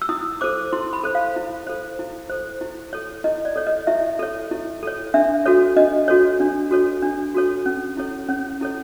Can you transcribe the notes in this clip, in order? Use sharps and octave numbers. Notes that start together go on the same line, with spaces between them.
E6
E4 D#6
A4 C5 D6
E4 C6
B5
A4 C5
F5
E4
A4 C5
E4
A4 C5
E4
A4 C#5
E4 D#5
D5
A4 C#5
D#5
E4 E5
A4 C#5
E4
A4 C#5
D4 E5
F#4 A4 C#5
D4 D#5
F#4 A4 C#5
D4
F#4 A4 C#5
D4
F#4 A4 C#5
C#4
E4 A4 C#5
C#4 C#5
E4 A4 C#5